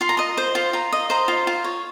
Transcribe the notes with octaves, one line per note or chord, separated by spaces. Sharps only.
F4 C6
A#5
D#5 C6
C5
F4
F4 A#5
D#5
C5 A#5
F4
F4
C#5